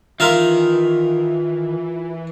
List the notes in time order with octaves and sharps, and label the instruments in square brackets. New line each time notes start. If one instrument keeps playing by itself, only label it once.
[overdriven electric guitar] D#3 [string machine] E3 [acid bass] F4 [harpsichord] A#4 E5 F5